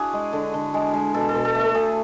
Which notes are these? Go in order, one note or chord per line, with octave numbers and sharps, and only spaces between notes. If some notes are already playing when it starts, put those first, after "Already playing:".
Already playing: D4 E4 F#4 G#4
G#3
D3
D3
G#3
G#3
B2 A4
A4
B2
A4
A3 A4
A3 G#4